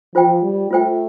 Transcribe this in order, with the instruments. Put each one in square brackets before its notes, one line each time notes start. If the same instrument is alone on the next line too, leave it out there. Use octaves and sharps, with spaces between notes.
[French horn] F3 [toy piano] F4 C5 G5
[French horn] G3
[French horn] A3 [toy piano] F4 C5 G5